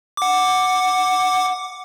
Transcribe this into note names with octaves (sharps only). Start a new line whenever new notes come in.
F#5 D6